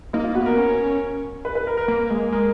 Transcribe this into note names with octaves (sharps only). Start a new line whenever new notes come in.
A#3 D#4
F4
B3 F#4
A#4
C#4
B4
B4
A#4
A#4
A#3
G#3
G#3 A#4